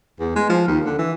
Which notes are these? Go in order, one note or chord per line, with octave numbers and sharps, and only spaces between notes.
E2
G#3
F3
D#2
D3
E3